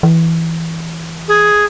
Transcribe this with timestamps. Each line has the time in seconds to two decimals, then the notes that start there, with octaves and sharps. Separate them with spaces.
0.03 E3
1.28 G#4